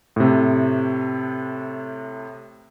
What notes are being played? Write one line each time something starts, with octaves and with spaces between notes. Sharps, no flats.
A2 C3